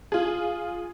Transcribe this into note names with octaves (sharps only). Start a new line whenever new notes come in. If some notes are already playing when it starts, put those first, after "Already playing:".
F4 G#4